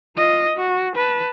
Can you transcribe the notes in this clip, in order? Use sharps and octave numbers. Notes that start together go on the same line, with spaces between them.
F4 D#5
F#4
B4 A5